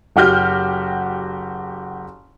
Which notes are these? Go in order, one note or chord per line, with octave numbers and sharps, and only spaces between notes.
F#1 F#4 G4 F6 G6